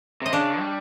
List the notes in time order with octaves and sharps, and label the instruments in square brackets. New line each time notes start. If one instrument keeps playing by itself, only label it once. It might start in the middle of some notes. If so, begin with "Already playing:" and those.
[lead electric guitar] C3 [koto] D#5
[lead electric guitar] C#3 [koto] D4 D5
[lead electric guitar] G3